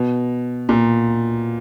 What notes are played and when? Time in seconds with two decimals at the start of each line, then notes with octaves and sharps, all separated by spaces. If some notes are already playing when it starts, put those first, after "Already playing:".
Already playing: B2
0.69 A#2